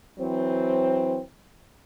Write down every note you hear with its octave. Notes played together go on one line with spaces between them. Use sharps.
E3 F#3 C4